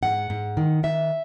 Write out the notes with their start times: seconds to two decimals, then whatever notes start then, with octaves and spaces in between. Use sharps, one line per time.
0.03 G#2 F#5
0.30 G#2
0.57 D#3
0.83 D#3 E5